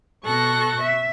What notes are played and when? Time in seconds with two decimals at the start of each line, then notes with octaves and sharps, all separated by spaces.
0.25 B2 A4 C#6 F#6 A#6
0.82 E5